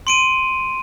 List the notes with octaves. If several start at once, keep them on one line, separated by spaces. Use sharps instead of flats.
C6 D7 D#7